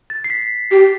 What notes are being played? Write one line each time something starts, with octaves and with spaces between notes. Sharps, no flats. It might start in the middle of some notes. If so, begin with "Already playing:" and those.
A6
C7
B6
G4